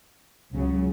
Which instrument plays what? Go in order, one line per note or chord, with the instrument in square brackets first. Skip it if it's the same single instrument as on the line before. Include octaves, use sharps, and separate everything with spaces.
[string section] C#2 C#3 F#3